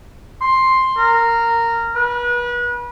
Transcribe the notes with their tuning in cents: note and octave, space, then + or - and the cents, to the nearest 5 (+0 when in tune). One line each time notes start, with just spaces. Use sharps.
C6 +5
A#4 -10
B4 -35